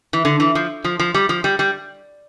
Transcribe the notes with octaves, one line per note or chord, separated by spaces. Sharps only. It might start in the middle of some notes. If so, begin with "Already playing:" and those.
E3
D3
E3
F3
F3
F3
G3
F3
G3
G3